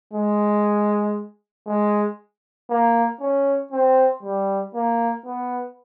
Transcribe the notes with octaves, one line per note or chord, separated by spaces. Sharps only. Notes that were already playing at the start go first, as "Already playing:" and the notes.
G#3
G#3
A#3
C#4
C4
G3
A#3
B3